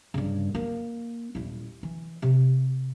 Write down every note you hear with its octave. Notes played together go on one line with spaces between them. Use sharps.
G2 C#3
A#3
D#1 E4
E3
C3